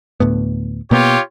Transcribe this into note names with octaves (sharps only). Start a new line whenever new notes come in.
D2 A2 B3
B2 A#3 B3 F4 G4 C#5